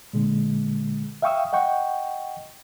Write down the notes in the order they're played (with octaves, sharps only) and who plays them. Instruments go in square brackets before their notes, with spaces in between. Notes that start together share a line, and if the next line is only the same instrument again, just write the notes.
[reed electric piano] A#2 D3 G#3
E5 F5 G5 C#6 D#6 E6
D#5 F#5 G5 C#6